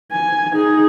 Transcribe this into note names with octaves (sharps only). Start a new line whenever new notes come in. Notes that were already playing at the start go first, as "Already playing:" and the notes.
G#5
D#4 G#4